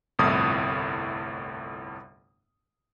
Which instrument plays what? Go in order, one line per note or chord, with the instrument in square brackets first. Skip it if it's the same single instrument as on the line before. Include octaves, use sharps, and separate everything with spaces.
[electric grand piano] G1 C2 F2 A2 E4 D#6